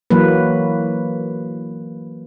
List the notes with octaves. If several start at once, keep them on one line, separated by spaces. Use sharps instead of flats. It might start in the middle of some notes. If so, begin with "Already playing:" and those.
E3 F#3 A#3 B4